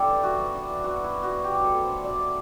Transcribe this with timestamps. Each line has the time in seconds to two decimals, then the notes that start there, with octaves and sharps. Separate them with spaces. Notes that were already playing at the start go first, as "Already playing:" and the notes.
Already playing: G3 D4 E4 G4 A4
0.09 E3
0.23 E3 F#4
0.39 B3
0.54 D4
0.69 E3
0.84 E3 F#4
0.99 B3 E4
1.14 D4
1.23 F#4
1.29 E3
1.44 B2 G4
1.60 F#3 A4
1.74 A3
1.84 C5
1.89 D4
2.04 B2 D5
2.19 F#3